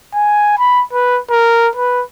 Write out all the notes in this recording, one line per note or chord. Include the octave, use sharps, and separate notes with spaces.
G#5
B5
B4
A#4
B4